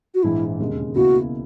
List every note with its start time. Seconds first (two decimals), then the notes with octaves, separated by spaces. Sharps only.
0.15 F#4
0.23 A#1 G#2 E3 E4
0.59 E1 D#2 C#3 G#3
0.95 C#2 B2 A#3 E4 F#4